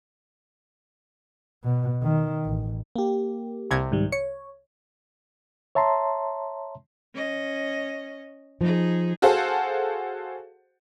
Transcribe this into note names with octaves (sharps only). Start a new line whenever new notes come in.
B2
D#3
A1
A#3 G4
C2 C3 G#6
G#2 D#3 G3
C#5 C#7
C#5 E5 A5 A#5 C6
C#4 D#5
F3 D#4 G#4
F#4 G#4 A4 C5 F5 F#5